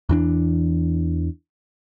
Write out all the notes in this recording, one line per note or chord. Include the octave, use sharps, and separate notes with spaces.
E2 E3 D4